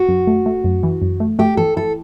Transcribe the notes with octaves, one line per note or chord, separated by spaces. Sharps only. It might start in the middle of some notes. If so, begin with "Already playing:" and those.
Already playing: F#4
F#2
A3
A3
F#2
E3
F#2
A3
A3 G4
E3 A4
E4 A4